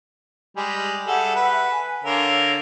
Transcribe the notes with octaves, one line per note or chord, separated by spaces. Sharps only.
G3 G#3 G#4
G3 G#4 A4 E5 F#5
B4
G#5
D3 A#4 C#5 F5 E6